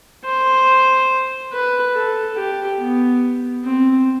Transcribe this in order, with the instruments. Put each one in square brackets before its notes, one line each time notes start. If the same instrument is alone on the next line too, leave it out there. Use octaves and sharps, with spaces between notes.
[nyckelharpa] C5
B4
A4
G4
B3
C4